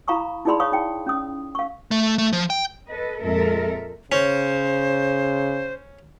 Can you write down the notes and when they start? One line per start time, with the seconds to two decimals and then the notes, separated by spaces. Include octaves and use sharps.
0.08 E4 F5 A#5 B5 C#6 D#6
0.45 D#4 E4 G#4 D5 B5 C6
0.60 C#5 F5 C#6 D#6
0.72 D#4 G5
1.06 C#4 D#6
1.55 F5 C#6
1.91 A3
2.18 A3
2.33 F3
2.50 G5
2.88 A4 B4 D#5
3.22 F2 A#2 G#3 A4 A#4 E5
4.12 C#3 C#4 C5